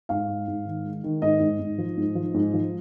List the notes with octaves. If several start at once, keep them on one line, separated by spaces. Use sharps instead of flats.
G#2 F5
G#3
G#2
D#3
G#3
D#3
G#2 D#5
G#2
G#2
F3
G#2
F3
G#2
F3